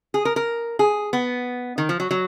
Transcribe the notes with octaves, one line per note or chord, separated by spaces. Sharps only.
G#4
A#4
A#4
G#4
B3
D#3
F3
F#3
F#3